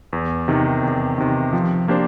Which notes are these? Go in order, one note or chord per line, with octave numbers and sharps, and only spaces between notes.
E2
C3 D#3
E2
C3 D#3
F3
A#3 D4 G4 C5